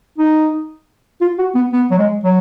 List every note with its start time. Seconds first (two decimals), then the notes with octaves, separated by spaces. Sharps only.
0.18 D#4
1.21 F4
1.39 F#4
1.55 B3
1.73 B3
1.91 F#3
1.99 G#3
2.24 F#3